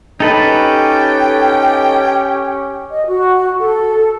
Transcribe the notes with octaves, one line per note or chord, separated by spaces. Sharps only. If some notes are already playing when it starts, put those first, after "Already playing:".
C#4 D#4 G4 A4 B4 G5
D#5
F#4
A4